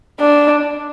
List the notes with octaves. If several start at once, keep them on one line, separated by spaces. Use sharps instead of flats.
D4